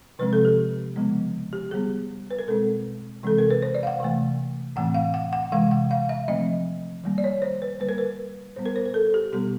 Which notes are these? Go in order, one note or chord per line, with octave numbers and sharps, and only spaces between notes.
C3 F3 G#3 C4 B4
A4
G4
C#3 F3 G#3 B3
G4
D3 G3 B3 G#4
B4
A#4
B2 G#3 C4 A4
C3 E3 G#3 C4 A4
A#4
B4
C5
D5
F5
F#5
C3 E3 A3
A2 E3 A3 C4 F#5
F5
F#5
F#5
C3 E3 G#3 F5
F#5
F5
E5
D3 F3 A3 C4 D#5
D#3 G3 A#3
D5
C#5
C5
B4
D3 G3 A#3 B4
A#4
B4
A#2 G3 B3 C5
A#4
C5
A#4
A4
G4
B2 G3 B3 G4